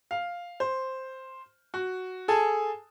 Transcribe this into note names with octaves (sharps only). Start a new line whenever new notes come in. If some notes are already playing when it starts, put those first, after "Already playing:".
F5
C5
F#4
G#4 A4 G#5 A5